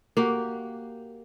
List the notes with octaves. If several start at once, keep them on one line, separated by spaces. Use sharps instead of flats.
A#3 F#4 G4